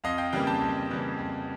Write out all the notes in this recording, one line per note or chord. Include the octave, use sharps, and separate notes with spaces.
F2 D#5 F5
F5 G5
C#3 E3 G3 A#3 F5 G5
G5 A5
F2
C#3 E3 G3 A#3
F2